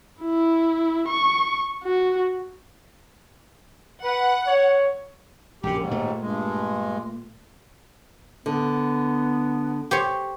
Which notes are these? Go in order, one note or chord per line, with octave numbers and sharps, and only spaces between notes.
E4
C#6
F#4
B4 F#5
C#5
A#1 F#2 C#3 G4
D#2 G#2
A#2 A3
G2 G#3
D3 B3
G4 C5 C#5